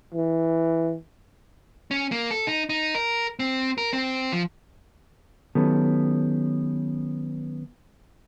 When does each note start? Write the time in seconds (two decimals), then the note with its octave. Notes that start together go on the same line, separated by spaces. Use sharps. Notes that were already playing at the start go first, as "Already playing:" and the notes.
0.14 E3
1.91 C#4
2.12 A#3
2.31 A4
2.47 D#4
2.69 D#4
2.95 A#4
3.39 C4
3.78 A#4
3.93 C4
4.32 F3
5.55 D#3 F#3 B3 C#4 G4 A4